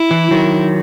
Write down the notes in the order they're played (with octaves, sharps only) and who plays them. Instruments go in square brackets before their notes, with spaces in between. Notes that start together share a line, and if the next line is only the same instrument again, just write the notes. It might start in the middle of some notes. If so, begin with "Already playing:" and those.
Already playing: [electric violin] E4
[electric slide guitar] E3
D#3 F#3